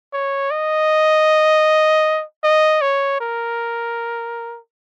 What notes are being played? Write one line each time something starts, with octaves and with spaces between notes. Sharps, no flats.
C#5
D#5
D#5
C#5
A#4